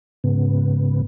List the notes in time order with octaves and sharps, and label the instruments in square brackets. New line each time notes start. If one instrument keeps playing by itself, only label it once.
[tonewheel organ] G#2 C#3 B3